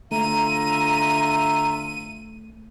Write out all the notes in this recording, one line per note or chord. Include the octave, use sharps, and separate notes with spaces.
D3 A3 F4 E5 A#5 D#7